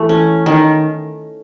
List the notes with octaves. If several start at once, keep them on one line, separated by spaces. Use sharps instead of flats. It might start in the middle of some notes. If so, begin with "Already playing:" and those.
Already playing: E3 A3
C#4
D#3